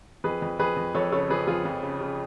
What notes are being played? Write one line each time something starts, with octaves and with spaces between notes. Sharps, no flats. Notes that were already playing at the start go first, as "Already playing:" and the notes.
F2 G#4 B4
F2
F2 G#4 B4
F2
F2 A4 C#5
C#3 A4 C#5
F3 G#4 B4
F2 F4 G#4
F2
C#3
C#3